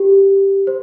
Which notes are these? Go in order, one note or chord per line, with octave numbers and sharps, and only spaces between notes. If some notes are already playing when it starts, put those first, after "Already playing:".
Already playing: G4
C5